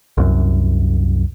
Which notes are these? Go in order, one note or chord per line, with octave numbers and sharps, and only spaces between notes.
C2 F#2